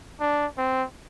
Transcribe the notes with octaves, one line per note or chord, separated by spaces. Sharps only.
D4
C4